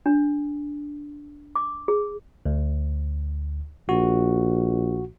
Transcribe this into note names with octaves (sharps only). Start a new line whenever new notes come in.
D4
D6
G#4
D2
A#1 F#4